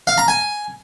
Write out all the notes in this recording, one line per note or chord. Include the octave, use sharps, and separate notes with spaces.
F5
A#5
G#5